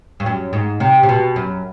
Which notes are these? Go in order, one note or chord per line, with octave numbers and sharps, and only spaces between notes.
G2
F#2
G#2
C3
C3
B2
F#2